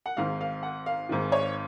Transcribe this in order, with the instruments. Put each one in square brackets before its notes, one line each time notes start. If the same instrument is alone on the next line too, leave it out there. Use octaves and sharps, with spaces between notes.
[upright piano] F#5
G#1 G#2 D#3 F5
F5
F#5
F5
G#1 G#2 D#3
C#5